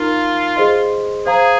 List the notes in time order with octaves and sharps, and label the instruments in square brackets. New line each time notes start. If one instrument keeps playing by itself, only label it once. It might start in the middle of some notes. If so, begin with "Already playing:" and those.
Already playing: [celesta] D#4 A#4 F5 A#5 [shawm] F4
[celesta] G#4 C5 D#5 C6
[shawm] G#4 [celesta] C5 F5 A#5